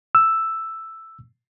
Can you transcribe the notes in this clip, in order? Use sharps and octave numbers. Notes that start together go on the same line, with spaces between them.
E6